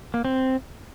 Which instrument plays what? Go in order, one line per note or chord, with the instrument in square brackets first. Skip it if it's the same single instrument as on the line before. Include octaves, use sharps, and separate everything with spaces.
[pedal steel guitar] A#3
C4